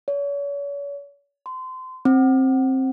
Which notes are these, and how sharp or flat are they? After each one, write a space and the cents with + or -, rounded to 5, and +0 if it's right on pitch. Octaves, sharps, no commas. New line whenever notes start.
C#5 +40
C6 -25
C4 +15